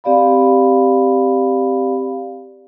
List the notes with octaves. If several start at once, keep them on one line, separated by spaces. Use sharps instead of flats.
C4 G4 D5 F5 B5